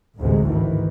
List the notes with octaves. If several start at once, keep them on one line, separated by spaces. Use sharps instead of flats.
A1 D2 G#2 C3 G#3
G#2 D#3 E3